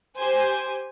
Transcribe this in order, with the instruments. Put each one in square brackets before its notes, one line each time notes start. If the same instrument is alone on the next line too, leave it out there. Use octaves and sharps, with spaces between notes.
[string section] G4 C5 G#5